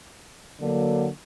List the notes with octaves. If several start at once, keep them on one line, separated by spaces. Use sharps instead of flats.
D3 F#3 A#3